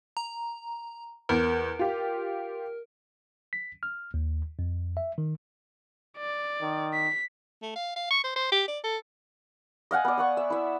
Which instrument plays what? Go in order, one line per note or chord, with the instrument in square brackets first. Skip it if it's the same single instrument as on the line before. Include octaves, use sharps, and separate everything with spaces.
[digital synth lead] A#5
[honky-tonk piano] E2 [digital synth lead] A#4
[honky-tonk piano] F4 G4
[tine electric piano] B6
F6
D#2
F2
E5
D#3
[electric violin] D5
[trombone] D#3
[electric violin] B6
[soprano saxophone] A3
F5
F5
C#6
C5
C5
G4
D5
A4
[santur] D#5 F5 F#5 G#5
B3 D5
D5 F#5 C#6
E5
E4 E5